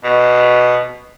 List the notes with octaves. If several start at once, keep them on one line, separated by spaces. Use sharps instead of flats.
B2